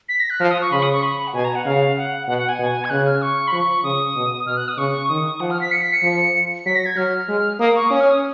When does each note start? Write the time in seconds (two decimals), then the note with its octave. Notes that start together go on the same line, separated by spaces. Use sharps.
0.09 B6
0.20 A#6
0.30 F#6
0.40 F3 F6
0.51 D#6
0.61 C#6
0.72 C#3 B5
0.83 D#6
0.93 C#6
1.03 B5
1.27 F#5
1.34 B2 G#5
1.45 A#5
1.55 F#5
1.65 C#3 F5
1.97 F#5
2.27 B2 F#5
2.38 F#5
2.49 G#5
2.59 B2
2.85 G#6
2.90 C#3 F#6
3.06 F6
3.22 C#6
3.48 B5
3.52 F3 C#6
3.84 C#3 D#6
4.16 B2
4.46 B2 F6
4.57 F#6
4.68 D#6
4.78 C#3 C#6
5.09 D#3 D#6
5.40 F3 F#5
5.51 F6
5.61 B6
5.72 C#7
5.82 B6
5.93 C#7
6.03 F3
6.66 F#3 B6
6.76 A#6
6.86 G#6
6.96 F#3 F6
7.29 G#3
7.60 A#3 D#6
7.75 C#6
7.90 C#4 D#6
8.01 F6
8.11 D#6